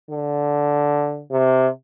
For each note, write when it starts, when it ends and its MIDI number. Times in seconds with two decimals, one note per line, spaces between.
0.11 1.23 50
1.31 1.68 48